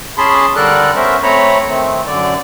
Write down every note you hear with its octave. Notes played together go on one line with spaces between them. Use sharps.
C#4 G#4 A5 B5 C6
D3 G3 A4 A#4 D5 F#6
B3 C#4 A#4 C5 E5
A3 C4 C#5 A#5 B5
D#3 A3 C4
F#2 D3 D5